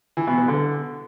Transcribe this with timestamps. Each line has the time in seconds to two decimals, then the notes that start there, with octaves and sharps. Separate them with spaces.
0.17 E3
0.27 B2
0.38 B3
0.48 D3